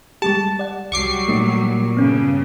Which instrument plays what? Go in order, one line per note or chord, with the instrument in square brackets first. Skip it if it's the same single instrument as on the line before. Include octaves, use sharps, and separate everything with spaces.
[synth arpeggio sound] G3 G#3 G4 [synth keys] A5
[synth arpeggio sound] D5 F#5
[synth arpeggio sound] C2 [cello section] F#3 G3 [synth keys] C#6 D6 C7
[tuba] A#2 [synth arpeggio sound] A3 D#4
[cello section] G2 C#3 [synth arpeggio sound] B3 C#4